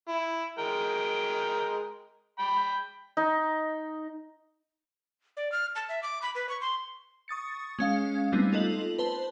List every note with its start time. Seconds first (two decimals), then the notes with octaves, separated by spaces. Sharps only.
0.08 E4
0.59 G#3 A#4 G5
2.39 G5 B5
3.17 D#4
5.37 D5
5.52 F6
5.75 A5
5.89 E5
6.03 D6
6.22 B5
6.35 B4
6.49 C#6
6.61 C6
7.28 C#6 D#6 A6 C#7
7.79 G#3 C#4 F5
8.32 G3 A3 B3 C4 D#4
8.53 F4 A4 D#5 F#7
8.99 B4 C5 A5